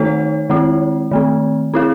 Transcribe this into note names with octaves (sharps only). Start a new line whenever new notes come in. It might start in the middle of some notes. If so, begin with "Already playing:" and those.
Already playing: D#3 A3 D#4 A4 C#5
D#3 G#3 C4 E4
D#3 A3 C4
C4 E4 G#4